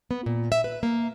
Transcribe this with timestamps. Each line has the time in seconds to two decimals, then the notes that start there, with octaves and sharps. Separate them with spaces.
0.11 B3
0.26 A#2
0.52 E5
0.64 B4
0.83 A#3